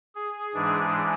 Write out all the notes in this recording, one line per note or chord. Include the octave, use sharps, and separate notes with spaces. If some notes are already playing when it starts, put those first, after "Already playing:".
G#4
G#2 E3 G#3 D4